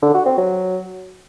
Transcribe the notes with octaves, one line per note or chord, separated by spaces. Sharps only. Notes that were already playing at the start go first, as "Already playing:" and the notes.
D3
F#4
C4
F#3